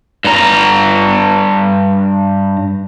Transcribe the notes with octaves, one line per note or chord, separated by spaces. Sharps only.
G2 A#5